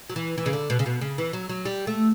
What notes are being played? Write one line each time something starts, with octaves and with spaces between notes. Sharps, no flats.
F#3
E3
E3
C#3
D3
B2
C#3
B2
C#3
E3
F#3
F#3
G3
A3